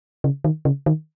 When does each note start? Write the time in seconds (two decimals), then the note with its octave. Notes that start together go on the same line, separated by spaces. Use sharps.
0.24 C#3
0.44 D#3
0.65 C#3
0.86 D#3